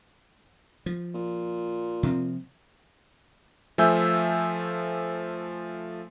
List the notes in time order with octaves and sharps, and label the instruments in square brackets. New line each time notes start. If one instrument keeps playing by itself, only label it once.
[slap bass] F3
[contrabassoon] A#2
[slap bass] C3 F3 C4
[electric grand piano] F3 A3 E5 G#5 E6 G6